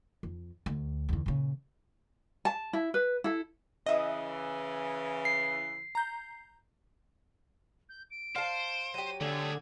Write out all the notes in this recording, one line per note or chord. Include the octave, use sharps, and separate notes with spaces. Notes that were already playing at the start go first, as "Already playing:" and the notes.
F2
D2
E2 D3
A#2 C#3
A5
E4
B4
E4 A4
C#3 E3 D#5 E5 D#6
C7
A#5 G6
G6
D7
C5 F5 A5
F#3 G4 D#7
D3 A3 G#4 G#6